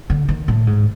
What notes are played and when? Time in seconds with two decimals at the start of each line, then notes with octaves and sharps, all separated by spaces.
0.10 D3
0.29 D#3
0.48 A2
0.67 G#2